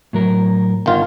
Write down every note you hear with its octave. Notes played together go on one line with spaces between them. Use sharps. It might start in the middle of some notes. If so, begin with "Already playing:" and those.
A2 F#3 A#4
G1 D#3 F4